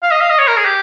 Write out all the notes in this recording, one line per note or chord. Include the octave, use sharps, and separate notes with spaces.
F5
D#5
F5
D#5
C#5
A#4
G#4
G4